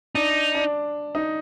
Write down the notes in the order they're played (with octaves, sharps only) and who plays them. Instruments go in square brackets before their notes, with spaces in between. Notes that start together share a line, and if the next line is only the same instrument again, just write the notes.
[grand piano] D4 [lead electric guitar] D#4
[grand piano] D4
D#4